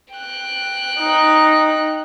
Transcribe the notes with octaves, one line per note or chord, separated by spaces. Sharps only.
G5 F#6
D#4